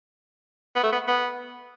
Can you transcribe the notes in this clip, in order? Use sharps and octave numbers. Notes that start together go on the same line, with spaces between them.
B3
A3
B3
B3